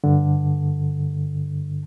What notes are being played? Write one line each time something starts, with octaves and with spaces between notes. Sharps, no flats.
G2 D3